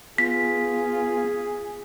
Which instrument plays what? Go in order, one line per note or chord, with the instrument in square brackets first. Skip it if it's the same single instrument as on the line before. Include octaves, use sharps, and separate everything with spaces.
[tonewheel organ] B3 [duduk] F4 [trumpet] G#4 [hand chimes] B6